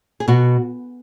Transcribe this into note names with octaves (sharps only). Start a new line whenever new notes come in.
G#4
B2 F#4